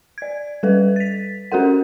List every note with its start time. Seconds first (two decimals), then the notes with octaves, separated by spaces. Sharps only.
0.18 D5 G#6
0.63 G3 A4 B4
0.96 A6 B6
1.52 C#4 F#4 A4 A#4 F#5